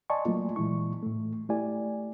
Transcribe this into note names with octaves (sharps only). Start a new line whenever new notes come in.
D5 D#5 G#5 A5 C6 C#6
F#3 A3 A#3 F4
A#2 E3 G#3 E4 C#6
A2 A3
A3 E4 G4 D5 G#5